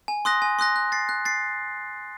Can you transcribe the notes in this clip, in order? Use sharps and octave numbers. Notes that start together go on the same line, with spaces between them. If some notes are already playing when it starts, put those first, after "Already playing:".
G#5
C6 D#6 F#6 A#6
G#5
C6 D#6 F#6 A#6
F#6
A6 C7
F#6
A6 C7